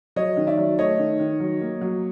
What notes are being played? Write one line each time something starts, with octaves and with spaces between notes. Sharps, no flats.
F#3 C#5 D#5
D#3
D5 E5
F#3
A3 C#5 D#5
D#3
D#3
F#3
A#3
F#3